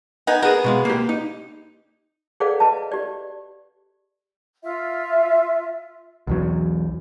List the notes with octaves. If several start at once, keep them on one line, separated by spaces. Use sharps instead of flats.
B3 D#4 G#5
B3 G#4 A#4
B2 G#3 F5
A#3 G4
D#4
G#4 A4 B4 D5 F5 F#5
B4 D#5 A5
G4 D5
F4 E5
B1 E2 F#3